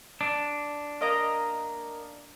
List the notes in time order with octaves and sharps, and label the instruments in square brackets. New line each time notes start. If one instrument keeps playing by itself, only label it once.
[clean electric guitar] D4
[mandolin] A#3 D#5 A#5